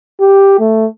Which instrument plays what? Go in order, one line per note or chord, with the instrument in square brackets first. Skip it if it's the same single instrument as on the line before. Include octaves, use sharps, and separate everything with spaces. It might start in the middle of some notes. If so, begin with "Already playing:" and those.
[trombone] G4
A3